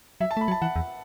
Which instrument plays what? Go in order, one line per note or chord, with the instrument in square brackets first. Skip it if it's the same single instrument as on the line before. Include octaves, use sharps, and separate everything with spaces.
[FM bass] F#3 [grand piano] E5
[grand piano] A5
[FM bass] A3 [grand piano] B5
[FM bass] F#3
[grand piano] A5
[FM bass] E3 [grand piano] F#5
[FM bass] E2